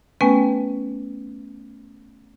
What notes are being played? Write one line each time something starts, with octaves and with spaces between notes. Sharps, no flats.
A3 B3 C#4 B4 G5 G#5